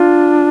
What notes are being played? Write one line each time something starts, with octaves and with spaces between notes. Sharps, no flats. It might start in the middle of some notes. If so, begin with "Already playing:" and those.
Already playing: D4 F4